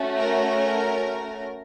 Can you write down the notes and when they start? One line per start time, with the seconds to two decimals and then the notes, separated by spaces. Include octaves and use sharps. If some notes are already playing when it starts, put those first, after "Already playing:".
Already playing: A3 C#4 F#4
0.16 A#4